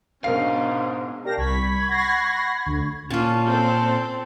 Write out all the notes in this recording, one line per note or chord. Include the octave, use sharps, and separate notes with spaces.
G#2 B2 C#4 D4 A#4 F5 C7
G4 A#4 D5 F5 A5 A#6
C2 B5 C#6 G#6 B6
F#5 A#6 C7
D2
A#2 C#4 F4 A5
C4 A4